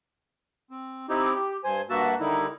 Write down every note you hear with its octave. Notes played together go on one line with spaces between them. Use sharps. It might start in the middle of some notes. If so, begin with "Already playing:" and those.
C4
C4 D#4 E4 G4
G4
G2 C5 G#5
G2 A#3 F#4 E5 A5
D3 D#3 G3 D#4 E4